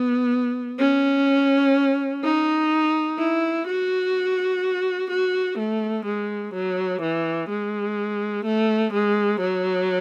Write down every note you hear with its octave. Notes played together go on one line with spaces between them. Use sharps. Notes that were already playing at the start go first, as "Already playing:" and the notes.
Already playing: B3
C#4
D#4
E4
F#4
F#4
A3
G#3
F#3
E3
G#3
A3
G#3
F#3